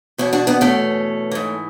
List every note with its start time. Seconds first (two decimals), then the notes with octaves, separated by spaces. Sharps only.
0.18 E2 B2 C#4 E4
0.33 D4 F#4
0.47 B3 D4
0.61 A3 C#4
1.32 G#2 E3